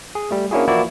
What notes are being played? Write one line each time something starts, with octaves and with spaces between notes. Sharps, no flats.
G#4
G3 A3
A#3 C#4 D4 E4 F#4 G#4
E3 F3 A#3 E4 F#4 D5